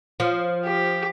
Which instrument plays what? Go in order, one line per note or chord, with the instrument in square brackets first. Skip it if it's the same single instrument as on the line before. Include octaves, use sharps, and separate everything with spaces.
[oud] F3
[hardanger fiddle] G4